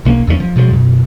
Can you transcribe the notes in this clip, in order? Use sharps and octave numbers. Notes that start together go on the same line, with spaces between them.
B1 A#3 C#4
E2 F3 A3 C#4
F3
B2 F3 F#3 G#3
F#2 B2